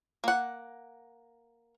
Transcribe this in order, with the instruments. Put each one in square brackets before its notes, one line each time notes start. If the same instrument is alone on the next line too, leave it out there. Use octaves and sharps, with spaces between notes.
[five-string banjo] A#3 F#5